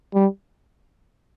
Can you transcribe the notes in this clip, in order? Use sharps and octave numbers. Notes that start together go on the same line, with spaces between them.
G3